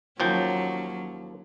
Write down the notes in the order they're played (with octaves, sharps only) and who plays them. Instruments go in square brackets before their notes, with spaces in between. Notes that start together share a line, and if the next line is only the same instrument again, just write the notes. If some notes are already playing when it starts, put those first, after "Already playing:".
[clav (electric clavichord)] D#2 F3 G5 [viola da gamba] F#3 C#4